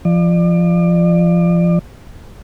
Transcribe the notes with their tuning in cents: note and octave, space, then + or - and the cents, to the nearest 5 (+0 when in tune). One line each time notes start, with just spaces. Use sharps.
F3 -20 D5 +35